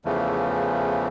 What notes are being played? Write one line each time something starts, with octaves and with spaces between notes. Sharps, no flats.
E2 C#3 E3 F3 A3